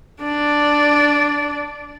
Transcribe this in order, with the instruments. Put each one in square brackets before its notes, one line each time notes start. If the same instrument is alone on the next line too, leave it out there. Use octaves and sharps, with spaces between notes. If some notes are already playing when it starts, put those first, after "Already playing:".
[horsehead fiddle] D4 D5